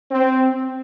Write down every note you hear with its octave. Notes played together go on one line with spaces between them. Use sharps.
C4